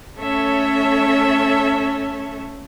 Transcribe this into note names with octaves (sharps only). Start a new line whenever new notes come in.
A3 C#4 A4 C#5 E5